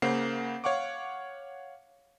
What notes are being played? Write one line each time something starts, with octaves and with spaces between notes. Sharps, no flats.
C#3 A#3 C5 F#5 C7
C#5 F5 F#5 C#6 D6